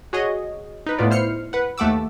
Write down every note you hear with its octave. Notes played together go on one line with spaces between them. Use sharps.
F#4 G#4 C#5 D#5
D#4 B4
A2 B3 F4 D5
E4 C5 F6 C7 C#7
B4 F#5
D#2 A3 F#5 D6 E6